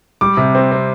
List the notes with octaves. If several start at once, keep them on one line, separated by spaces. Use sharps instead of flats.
G3 D6
C3
C4
C4